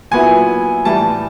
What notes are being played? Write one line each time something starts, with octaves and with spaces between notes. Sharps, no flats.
A#2 F#3 B3 E4 G#5
A2 E3 G3 A5